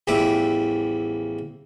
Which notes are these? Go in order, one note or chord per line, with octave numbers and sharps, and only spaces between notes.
A1 E2 F3 G3 E5 D6